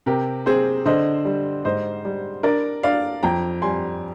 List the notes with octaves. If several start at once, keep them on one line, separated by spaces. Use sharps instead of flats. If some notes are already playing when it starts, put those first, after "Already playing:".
C3 G4 A#4
C4 G#4 C5
D3 C5 D#5
G3
G#2 C5 D#5
G3
D4 A#4 D5
D4 D5 F5
F2 G5 A#5
G3 G#5 C6